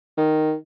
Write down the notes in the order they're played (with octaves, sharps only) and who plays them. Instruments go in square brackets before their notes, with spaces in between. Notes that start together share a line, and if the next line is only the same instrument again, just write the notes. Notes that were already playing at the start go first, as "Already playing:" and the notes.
[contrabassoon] D#3